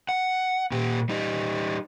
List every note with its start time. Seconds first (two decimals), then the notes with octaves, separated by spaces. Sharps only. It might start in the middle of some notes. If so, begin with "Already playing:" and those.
0.09 F#5
0.72 A#2 G4
1.09 G3 D#4